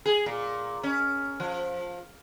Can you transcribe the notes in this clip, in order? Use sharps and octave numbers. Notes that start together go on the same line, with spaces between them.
G#4
A#2
C#4
F3